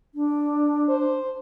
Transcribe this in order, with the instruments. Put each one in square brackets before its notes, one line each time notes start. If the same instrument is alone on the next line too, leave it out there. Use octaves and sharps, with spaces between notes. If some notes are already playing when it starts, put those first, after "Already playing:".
[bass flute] D4
[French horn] C5